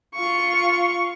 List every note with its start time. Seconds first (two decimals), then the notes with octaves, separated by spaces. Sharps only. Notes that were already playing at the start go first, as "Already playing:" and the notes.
0.15 F4 C#6